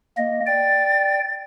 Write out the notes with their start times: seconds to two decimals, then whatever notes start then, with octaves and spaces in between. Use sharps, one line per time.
0.18 A#3 D#5
0.46 D5 G5 A6